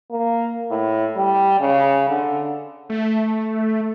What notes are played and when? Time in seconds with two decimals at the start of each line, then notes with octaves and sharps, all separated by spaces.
0.11 A#3
0.71 A2
1.17 G3
1.60 C#3
2.09 D3
2.89 A3